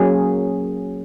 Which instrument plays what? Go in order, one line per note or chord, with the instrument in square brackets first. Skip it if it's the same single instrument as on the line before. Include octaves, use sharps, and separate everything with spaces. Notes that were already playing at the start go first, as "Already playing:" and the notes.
Already playing: [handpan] F#3 A#3 C#4 G#4